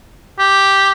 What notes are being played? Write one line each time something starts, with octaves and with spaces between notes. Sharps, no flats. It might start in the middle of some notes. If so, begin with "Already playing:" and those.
G4